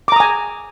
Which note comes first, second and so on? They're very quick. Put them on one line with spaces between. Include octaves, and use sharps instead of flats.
D6 A#5 D#6 G#5